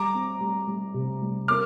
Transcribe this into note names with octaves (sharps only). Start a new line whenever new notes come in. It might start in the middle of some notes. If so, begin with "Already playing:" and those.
Already playing: G3 A#5 D6
C4
G3
G3
C3
G3
A#3 D6 F6